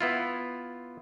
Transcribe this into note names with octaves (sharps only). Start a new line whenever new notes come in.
B3 E4 F4